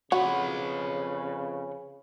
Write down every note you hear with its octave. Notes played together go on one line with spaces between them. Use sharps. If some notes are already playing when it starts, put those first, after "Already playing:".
F2 C#3 F#4 B4 C#5